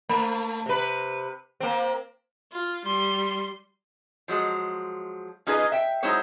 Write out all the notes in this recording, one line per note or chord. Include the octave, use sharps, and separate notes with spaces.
A3
C3 B4
A#3 C4
F4
G3 C6
F3 F#3 G#3
C#4 D#4 F4 G#4 B4 D#5
E5 G5
F#3 G#3 D#4 E4 C5 C#5